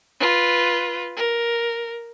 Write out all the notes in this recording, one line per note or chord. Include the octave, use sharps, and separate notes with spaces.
F4 B4
A#4